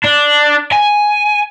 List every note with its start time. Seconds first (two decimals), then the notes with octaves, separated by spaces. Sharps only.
0.04 D4
0.72 G#5